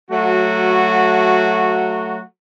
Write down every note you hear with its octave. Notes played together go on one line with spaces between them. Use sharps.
F#3 A3 F#4